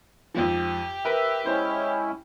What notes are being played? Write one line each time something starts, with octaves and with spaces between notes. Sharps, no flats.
F2 G#2 F3 G4
A#4 B4 E5
G#3 C#4 E4 C5